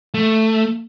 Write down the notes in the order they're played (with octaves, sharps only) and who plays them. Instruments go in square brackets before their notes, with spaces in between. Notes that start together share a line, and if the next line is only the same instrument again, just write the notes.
[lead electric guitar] A3